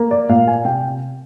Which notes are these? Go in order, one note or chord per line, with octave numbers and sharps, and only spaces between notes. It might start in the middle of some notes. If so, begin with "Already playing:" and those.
Already playing: A#3
D5
A#2 F5
G#5
C3 G5